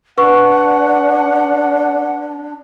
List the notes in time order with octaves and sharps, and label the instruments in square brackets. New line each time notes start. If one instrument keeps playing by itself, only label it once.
[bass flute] D4 [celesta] B4 C#6 [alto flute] F#5